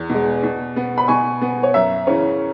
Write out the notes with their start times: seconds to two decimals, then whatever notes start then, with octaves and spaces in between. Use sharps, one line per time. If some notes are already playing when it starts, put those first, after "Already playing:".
Already playing: E2
0.10 B2 G#3
0.43 B2
0.76 B3
0.98 B5
1.08 B2 G#5 C#6
1.41 B3
1.63 C#5
1.74 F#2 E5
2.07 C#3 E3 C#4 C#5